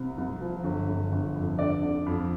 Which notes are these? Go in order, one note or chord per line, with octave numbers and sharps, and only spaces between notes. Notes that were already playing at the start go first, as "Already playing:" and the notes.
Already playing: C2 C3
C2
F3
G1
G1
G1
F2
D3 D5
D3
F2